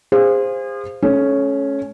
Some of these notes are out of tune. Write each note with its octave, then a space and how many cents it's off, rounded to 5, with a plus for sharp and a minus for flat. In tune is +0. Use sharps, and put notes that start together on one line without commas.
G#4 -35 C5 +0 F5 +0
A3 -35 C#4 +0